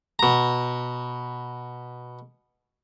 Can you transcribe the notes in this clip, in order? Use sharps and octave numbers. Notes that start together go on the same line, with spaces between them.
B2 A#5